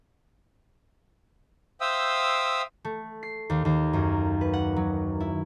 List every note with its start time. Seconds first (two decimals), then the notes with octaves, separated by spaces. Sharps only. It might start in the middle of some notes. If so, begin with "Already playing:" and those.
1.81 C5 E5 F5 G5 D#6 E6
2.85 A3
3.23 C7
3.50 D#2
3.65 D#2
3.93 F#2
4.41 B4
4.53 F#5
4.76 F#3
5.20 E4